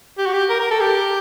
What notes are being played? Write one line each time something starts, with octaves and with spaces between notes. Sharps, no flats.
G4
F#4
G4
A#4
A#4
A4
G4